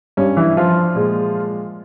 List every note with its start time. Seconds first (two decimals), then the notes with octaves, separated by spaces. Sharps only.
0.17 G2 G3 C#4
0.37 E3 E4
0.57 F3 F4
0.95 A#2 G#3